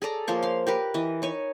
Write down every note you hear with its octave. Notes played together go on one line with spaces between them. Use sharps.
G#4 A4 D5 A#5
F3 A#3 C5 C#5
F5 C6
G4 A#4 B4
E3 D#5
D#4 C#5 G#5